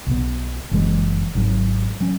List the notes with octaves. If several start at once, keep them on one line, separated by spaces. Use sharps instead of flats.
B1 B2 B3
F#1 F#2 E3 G#3
G#1 G#2 F#3
F#3 C#4